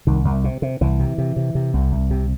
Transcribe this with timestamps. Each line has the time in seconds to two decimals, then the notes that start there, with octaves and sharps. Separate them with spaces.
0.07 C2 D#3
0.25 C2
0.44 C3
0.62 C3
0.81 C2 E3
1.00 C3
1.18 C3
1.36 C3
1.55 C3
1.74 C2
1.92 C2
2.11 C3